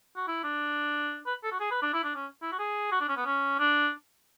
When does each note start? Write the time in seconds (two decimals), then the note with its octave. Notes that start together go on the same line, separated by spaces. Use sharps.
0.16 F#4
0.28 E4
0.43 D4
1.26 B4
1.43 A4
1.52 F#4
1.60 G#4
1.71 B4
1.82 D4
1.94 E4
2.04 D4
2.16 C#4
2.42 E4
2.52 F#4
2.59 G#4
2.92 F#4
3.01 D4
3.09 C#4
3.17 B3
3.25 C#4
3.59 D4